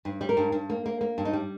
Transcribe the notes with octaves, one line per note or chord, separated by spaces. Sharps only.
G2
G3
A#4
G2
G2
A#3
A#3
A#3
G2
D#4
G3